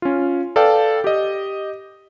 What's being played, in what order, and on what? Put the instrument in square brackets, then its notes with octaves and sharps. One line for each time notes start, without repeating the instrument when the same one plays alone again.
[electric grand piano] C#4 F4
A4 B4 D5 F5 G5 A5
G4 D#5